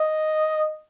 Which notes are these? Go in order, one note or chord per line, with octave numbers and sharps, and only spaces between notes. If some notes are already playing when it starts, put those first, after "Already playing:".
Already playing: D#5